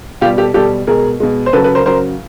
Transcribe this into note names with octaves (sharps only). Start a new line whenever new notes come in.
B2 G3 F4 G4
G4 A4
B2 G3 G4 A4
B2 G#3 G#4 A#4
B2 G#3
C5
C#3 F#3 A4 B4
A4 B4
A#4 C5
C#3 F#3 A#4 C5